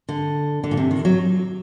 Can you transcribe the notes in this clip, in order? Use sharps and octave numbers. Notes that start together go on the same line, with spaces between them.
D3
D3
A#2
C3
D#3
F#3